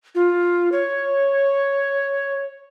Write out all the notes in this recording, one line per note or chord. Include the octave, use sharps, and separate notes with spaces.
F4
C#5